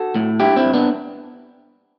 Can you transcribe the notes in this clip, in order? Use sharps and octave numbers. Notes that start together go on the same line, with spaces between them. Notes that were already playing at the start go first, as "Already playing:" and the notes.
Already playing: F#4 A4
A2
G2 E4 G4
C4 E4
G2
B3 D4